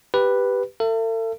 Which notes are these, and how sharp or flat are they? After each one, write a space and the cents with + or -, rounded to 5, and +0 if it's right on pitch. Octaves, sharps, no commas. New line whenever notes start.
G4 +0 B4 +0
A4 +40 E5 +40